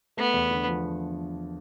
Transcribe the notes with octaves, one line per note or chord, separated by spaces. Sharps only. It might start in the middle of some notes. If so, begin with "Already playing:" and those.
A3 B3
E2
D3
F3